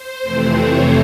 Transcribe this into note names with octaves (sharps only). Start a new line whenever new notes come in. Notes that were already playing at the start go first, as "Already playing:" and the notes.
Already playing: C5
F2 C3 E3 A3 C4
C#5